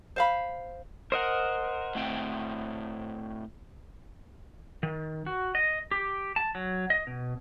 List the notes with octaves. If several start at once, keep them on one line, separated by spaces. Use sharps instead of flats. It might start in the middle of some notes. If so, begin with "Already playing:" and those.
C5 F5 B5
A#4 C5 D#5 F#5
A2 C4 G5
D#3
F#4
D#5
G4
A5
F#3
D#5
B2